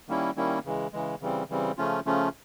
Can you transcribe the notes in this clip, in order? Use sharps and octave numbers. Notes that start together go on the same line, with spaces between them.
D#3 G3 A#3 C#4 E4
D#3 G3 A#3 C#4 E4
C#3 E3 G#3
C#3 E3 G#3
C#3 E3 G3 C4
C#3 E3 G3 C4
C#3 F3 A3 C#4 F4
C#3 F3 A3 C#4 F4